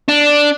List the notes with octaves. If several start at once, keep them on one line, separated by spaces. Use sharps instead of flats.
D4